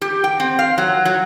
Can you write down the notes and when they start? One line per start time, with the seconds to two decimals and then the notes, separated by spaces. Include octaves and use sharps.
0.01 G4
0.24 G5
0.40 C4
0.59 F5
0.78 F#3
1.05 F#3